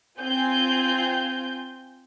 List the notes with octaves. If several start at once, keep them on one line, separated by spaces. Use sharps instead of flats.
C4 F4 G#5 G6